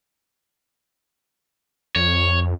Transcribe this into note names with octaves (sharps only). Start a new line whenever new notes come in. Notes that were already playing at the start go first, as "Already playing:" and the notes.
F2 C#5